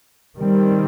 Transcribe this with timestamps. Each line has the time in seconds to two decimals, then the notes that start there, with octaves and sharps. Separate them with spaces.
0.38 D#3 G3 C4